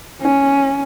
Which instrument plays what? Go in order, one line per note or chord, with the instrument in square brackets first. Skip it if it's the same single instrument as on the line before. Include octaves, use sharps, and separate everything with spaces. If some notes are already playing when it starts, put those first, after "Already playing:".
[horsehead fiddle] C#4